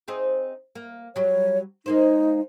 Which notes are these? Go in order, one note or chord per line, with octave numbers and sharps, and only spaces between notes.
C4 D#4 G#4
A#3
F#3 G3 C#5
G#3 A#3 D#4 C5